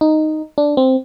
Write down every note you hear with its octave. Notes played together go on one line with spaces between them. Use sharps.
D#4
D4
C4